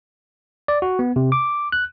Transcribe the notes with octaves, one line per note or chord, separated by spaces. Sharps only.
D5
F#4
B3
C3
D6
F#6